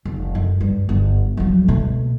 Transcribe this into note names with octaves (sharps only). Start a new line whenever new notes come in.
F1
F#2
G2
G1
F2 F#3
B2 A3